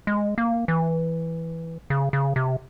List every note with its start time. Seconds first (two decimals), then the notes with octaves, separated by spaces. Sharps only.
0.07 G#3
0.38 A#3
0.68 E3
1.90 C#3
2.13 C#3
2.36 C3